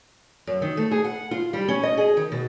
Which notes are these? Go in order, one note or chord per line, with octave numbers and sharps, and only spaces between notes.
F#2
D#3
A3
G#4
F#5
F4
G3
C#4
D#5
G#4
D#3
B2